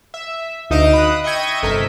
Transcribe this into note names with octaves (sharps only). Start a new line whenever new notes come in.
E5
D2 D#4 D#5 F5 D7 E7
B5 D#6 F#6
D#5 E5 G5 C#6 G#6 D#7
G1 C3 A4 A#4 E5 B6